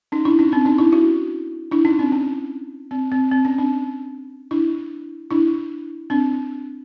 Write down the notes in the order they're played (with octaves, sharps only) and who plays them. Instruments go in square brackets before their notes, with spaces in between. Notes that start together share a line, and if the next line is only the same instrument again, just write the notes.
[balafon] C#4 D#4
D4 E4
C#4 D#4
C4 D4
C#4 D#4
D4 E4
E4 F#4
D4 E4
C#4 D#4
C4 D4
C#4
C4
C4
C4
C#4
C4 D4
D4 E4
D4 E4
C4 D4